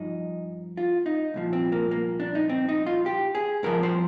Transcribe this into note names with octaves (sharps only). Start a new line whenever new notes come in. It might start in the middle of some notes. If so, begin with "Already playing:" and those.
Already playing: G2 F3 D#4
F4
D#4
C2 A#2 F3
C4
A#3
A#3
D4
D#4
C4
D#4
F4
G4
G#4
G2 F3 A#4
C5